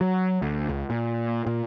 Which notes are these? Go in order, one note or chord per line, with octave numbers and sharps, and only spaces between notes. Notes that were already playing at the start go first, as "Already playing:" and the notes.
F#3
D2
C#2
A#2
A#2